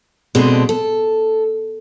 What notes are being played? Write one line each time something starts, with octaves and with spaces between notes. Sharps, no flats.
B2 G#3 C4 D4 A4
A4